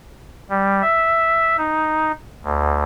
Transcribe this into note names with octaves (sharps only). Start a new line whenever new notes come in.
G3
E5
D#4
D2